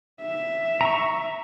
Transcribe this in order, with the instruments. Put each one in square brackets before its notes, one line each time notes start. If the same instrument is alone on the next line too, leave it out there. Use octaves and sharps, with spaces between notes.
[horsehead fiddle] E5
[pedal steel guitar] A#5 C#6